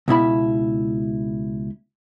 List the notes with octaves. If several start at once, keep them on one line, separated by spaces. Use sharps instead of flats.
C#2 B2 E4 B5